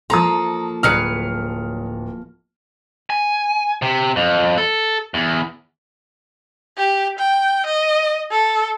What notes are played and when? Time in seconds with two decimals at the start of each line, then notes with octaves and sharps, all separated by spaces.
0.10 F3 A#3 A4 A#5 C6 D#6
0.83 D1 F#3 G#4 B4 F6 C#7
3.10 G#5
3.82 C3
4.16 F2
4.58 A4
5.14 E2
6.78 G4
7.19 G5
7.66 D#5
8.31 A4